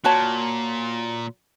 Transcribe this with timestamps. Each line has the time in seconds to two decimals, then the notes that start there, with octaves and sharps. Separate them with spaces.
0.04 A#2 F#4 C#5 A5